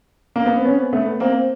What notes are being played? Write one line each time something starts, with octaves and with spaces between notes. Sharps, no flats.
A#3
B3
C4
B3 C#4
A3 B3
A#3 C4